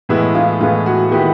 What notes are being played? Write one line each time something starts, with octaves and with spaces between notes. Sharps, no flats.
A2 E3 G#3 B3 E4
F4
A2 E3 G#3 B3 F4
F#4
D#3 G#3 B3 E4 G4